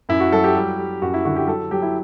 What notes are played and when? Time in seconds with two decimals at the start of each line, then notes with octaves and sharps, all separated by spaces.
0.09 F#2 E4
0.20 F#4
0.32 F#3 A4
0.44 G4
0.56 G3
0.78 G3
1.02 F#2 F#4
1.14 E4
1.25 D3 F#4
1.36 G4
1.47 F#3 A4
1.71 F#3 G4
1.82 E4